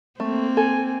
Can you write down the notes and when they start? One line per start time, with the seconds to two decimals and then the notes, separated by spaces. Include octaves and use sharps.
0.20 A3 A#3 C4
0.57 A4 G#5